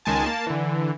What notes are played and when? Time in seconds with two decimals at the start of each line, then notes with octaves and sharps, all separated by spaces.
0.05 C#2 D#3 G#3 G#5 A5
0.26 A#3 A5
0.47 D3 E3